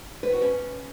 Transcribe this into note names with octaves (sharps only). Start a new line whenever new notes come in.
B4
F#4
C#4